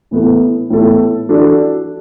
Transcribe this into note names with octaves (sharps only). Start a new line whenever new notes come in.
A2 E3 B3 E4 A4
A2 E3 B3 E4 A4
E3 D4 F#4 A4